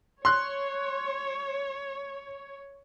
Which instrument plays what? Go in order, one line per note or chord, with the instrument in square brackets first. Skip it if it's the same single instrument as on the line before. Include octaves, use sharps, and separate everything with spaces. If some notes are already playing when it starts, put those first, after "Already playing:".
[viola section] C#5 [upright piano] C6 F#6